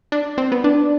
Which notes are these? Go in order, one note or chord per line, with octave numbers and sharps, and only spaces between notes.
D4
C4
B3
D4